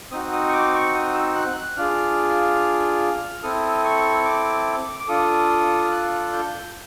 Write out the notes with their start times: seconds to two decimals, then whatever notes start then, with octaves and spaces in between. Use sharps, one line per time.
0.11 C4 D#4 F#4 D#6
0.33 D#6
0.49 C#6
0.53 D6
0.74 C#6
0.95 D#6
1.14 E6
1.35 F#6
1.57 F#6
1.77 D4 F4 G#4 F6
3.43 C4 E4 A4 D#6
3.85 C#6
4.25 D6
5.00 D6
5.08 D4 F4 A4 D#6
5.85 F6
5.91 F#6
6.33 G6